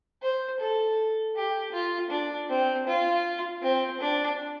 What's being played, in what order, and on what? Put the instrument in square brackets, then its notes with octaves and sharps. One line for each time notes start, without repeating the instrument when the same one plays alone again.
[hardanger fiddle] C5
A4
G4
F4
D4
C4
F4
C4
D4